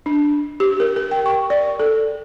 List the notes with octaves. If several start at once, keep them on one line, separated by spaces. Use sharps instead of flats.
D4
G4
A#4
A#4
G5
C#6
D5
A4